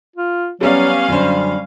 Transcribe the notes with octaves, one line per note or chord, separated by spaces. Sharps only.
F4
F#3 G3 B3 C#4 D5 F5
F#2 D3 G3 C5